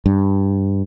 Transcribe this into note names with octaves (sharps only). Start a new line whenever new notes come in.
G2